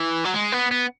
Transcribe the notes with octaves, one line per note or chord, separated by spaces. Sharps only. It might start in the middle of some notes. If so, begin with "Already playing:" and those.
Already playing: E3
F#3
G#3
B3
B3